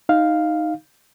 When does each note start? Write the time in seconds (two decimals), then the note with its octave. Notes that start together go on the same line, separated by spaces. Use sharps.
0.09 D#4 F5